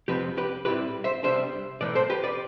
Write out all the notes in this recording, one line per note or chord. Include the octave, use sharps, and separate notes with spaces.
F2 C3 F3 C4 G4 B4
G4 B4
A2 G3 C4 E4 G4 B4
C5 E5
C3 G3 B3 D4 C5 E5
B1 A2 E3 A3 B4 D5
A4 C5
G4 B4
B4 D5